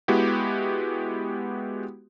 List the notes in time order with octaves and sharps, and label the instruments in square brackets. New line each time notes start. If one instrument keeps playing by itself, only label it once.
[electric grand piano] G#3 B3 E4 F#4 G4